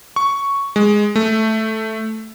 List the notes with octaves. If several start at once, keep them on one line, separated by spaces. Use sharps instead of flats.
C#6
G#3
A3